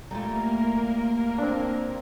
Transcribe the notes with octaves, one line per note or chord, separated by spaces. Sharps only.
G3 A3 A#3 F4 A#4 G#5 A#5
C4 D4 D6